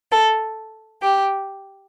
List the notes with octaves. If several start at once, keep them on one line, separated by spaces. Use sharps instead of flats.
A4
G4